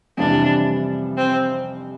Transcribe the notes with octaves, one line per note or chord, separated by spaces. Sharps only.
F2 C3 E3 G3 D4
C4